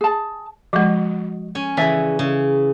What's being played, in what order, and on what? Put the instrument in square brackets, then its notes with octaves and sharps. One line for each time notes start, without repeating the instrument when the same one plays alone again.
[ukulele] G#4 A5
[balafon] F3 G#3 [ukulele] F#4 D#5
[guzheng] C#4 G#5
[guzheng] C#3 E3 [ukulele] D5 E5 G#5
[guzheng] C#3